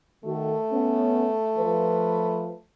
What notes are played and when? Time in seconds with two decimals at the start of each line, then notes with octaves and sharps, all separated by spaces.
0.25 D#3 A3 F#4 A4
0.71 B3 C#4
1.57 F3 B4